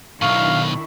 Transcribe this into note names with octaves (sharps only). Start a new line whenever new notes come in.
B1 B2 D#3 D4 E4 F5 C#6